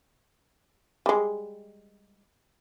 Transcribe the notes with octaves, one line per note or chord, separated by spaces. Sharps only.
G3 G#3